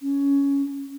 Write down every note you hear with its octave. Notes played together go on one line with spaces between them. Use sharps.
C#4